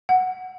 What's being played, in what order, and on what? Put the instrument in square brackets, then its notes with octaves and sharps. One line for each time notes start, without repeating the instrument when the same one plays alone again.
[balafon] F#5